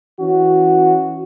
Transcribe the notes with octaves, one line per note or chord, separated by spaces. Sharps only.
E3 C#4 F#4